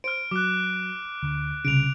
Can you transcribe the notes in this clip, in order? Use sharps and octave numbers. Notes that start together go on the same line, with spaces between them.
C5 F6 D7
F#3 D6 F#6
D2
C2 C#3 D7 F7